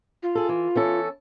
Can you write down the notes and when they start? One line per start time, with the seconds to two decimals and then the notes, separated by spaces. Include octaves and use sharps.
0.23 F4
0.35 G#4 A4
0.49 E3
0.75 E3 C#4 A4